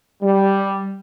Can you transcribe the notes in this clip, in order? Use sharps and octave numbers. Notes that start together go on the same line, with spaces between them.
G3